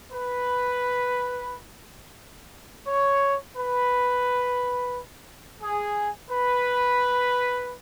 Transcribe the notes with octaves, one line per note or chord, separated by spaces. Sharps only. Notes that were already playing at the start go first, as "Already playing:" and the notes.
B4
C#5
B4
G#4
B4